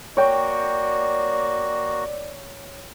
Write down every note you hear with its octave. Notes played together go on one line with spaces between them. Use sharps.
A#3 F#4 C#5 D5 G5